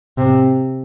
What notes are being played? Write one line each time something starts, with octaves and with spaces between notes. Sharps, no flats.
C3